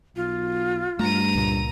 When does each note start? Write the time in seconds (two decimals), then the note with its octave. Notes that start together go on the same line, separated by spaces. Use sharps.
0.16 B1 F4
0.99 G2 A3 A#5 D#7
1.35 C#2 A#2